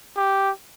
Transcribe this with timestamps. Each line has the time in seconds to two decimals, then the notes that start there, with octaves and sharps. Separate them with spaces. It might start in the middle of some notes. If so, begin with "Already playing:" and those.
0.17 G4